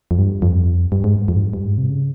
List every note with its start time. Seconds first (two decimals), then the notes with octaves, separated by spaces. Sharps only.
0.11 F2
0.18 G2
0.42 F2
0.92 G2
1.04 G#2
1.28 F2
1.36 G#2
1.41 G2
1.53 G2
1.66 G#2
1.78 C3
1.90 C#3